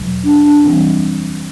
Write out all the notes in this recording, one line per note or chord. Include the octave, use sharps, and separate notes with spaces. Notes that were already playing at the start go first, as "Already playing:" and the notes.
Already playing: E2 B2 F#3
D4
D4
F#2 E3 G3 C4